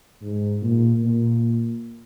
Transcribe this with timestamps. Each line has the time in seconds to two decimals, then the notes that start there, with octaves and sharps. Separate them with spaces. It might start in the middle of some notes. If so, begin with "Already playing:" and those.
0.22 G#2
0.63 A#2
1.03 A#2